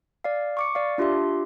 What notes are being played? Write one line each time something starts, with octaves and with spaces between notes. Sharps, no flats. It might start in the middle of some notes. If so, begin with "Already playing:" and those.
D5 F5
C#6 D6 C#7
D5 F5
D4 F4 G4 E5 C6